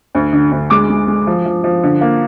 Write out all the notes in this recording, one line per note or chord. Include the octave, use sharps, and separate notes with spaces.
D2
D3
D2
G#3 D6
G#3
G#3
F3
F3
F3
D3
A#3